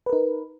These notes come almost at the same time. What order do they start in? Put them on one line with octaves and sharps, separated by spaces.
B4 A#4 D#4